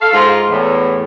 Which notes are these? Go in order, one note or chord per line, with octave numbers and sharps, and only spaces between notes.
A4 F5
G#2 F4
E2 A2